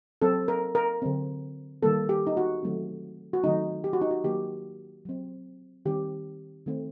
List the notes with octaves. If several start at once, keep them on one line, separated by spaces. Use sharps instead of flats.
F#3 C4 A4
A#4
A#4
D3 F#3 C4
D#3 G3 A#3 A4
G4
D#4
F#4
D#3 F#3 A3 C4
F#4
D#3 F#3 A3 C4 D#4
G4
F#4
D#4
F#4
D#3 F#3 A#3 G4
F#3 C4
D#3 G3 C4 G4
D#3 A3 C4